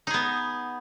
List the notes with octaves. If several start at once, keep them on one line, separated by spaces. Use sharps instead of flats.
B3 D#4 G#4